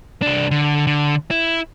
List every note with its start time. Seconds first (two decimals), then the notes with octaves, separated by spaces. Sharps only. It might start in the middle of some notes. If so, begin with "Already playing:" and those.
0.22 C2 D4
0.51 D3
0.87 D3
1.31 E4